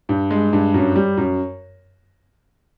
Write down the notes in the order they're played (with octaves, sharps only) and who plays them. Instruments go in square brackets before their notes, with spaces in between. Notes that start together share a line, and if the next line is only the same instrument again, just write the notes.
[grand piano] G2
G#3
G2
F#2
G3
F#2